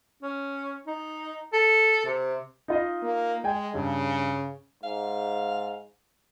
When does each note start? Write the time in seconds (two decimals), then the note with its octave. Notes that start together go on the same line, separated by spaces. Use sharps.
0.23 C#4
0.87 D#4
1.53 A4
2.06 C3
2.68 D#4 F4 D#5
3.03 A#3
3.44 G#3 G5 G#5
3.75 G2 C#3
4.84 G#2 F5